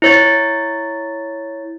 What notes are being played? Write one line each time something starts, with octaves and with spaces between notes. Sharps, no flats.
E4 C#5 A6